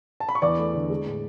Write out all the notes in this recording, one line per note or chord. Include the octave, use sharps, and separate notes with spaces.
A5
B5
C#6
E2 D5 D6
A3
D3
G#3
A2